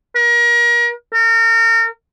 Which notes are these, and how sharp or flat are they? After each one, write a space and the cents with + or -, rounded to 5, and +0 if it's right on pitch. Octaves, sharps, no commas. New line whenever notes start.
A#4 +35
A#4 -35